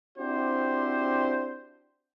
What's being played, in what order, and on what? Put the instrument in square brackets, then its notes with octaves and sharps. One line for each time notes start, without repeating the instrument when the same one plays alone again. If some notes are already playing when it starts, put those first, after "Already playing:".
[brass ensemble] C4 D4 E4 F#4 G4 C5